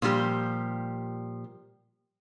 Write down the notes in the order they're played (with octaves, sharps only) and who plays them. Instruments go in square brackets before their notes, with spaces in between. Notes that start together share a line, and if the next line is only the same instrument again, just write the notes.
[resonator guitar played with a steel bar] A#2 F3 G3 G4